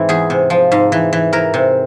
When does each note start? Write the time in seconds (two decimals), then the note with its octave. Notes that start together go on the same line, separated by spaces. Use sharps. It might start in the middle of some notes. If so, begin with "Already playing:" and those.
Already playing: G#2 E3 C4 E4
0.09 E2 G#4
0.30 C3
0.50 F3
0.72 G#2
0.92 E3
1.13 E3
1.33 E3 A#4
1.54 C3